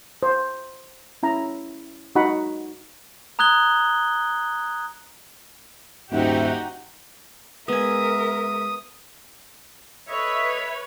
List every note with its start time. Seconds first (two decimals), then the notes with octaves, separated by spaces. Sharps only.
0.23 C5
1.23 C#4 E4 A#5
2.16 D#4 F#4 F#5 B5
3.39 A#5 D#6 F#6 G#6 G7
6.12 D#1 G#2 D#4 F#4 G4 E5
7.68 G#3 B3 A#4 E5 G#5 D#6
10.08 A4 B4 C#5 D#5 E5